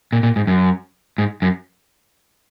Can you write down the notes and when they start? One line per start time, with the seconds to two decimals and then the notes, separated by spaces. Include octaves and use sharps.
0.13 A#2
0.23 A#2
0.36 G#2
0.47 F#2
1.18 G#2
1.42 F#2